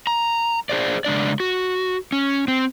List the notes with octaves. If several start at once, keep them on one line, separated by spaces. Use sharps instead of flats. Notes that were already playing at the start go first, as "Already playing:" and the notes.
A#5
D4 G#4 C5 D5
C#3 G#3 D4 D5
F#4
C#4
C4